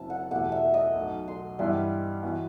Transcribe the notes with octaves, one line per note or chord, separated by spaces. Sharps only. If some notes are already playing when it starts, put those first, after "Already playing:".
Already playing: F#1 F#2 F#3 C4 E4 A5
F#5
E2 B2 A3 E4 G4 F#5
E5
D#5
B1 B2 A3 D#4
C6
G2 E3 G3 B3 E4 C6
E3 B3 F#4